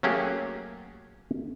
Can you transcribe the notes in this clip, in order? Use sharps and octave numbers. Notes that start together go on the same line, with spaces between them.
F#3 A3 A#3 C#4 G4 G#4